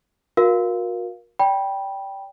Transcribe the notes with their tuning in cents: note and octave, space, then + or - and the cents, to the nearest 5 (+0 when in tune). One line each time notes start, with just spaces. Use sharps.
F#4 -35 A#4 +20 F5 +0
D5 -30 G5 +0 B5 -25